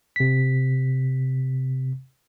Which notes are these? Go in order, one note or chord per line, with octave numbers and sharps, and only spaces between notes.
C3 B6